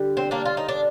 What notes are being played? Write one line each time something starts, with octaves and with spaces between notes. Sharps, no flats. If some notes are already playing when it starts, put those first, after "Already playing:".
Already playing: D3 G3
C4
A#3 D4
F4
D#4
D4